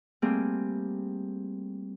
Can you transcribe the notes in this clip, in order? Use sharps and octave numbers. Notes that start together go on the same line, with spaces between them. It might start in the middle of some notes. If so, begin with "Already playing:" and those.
G3 A3 A#3 C4 G#4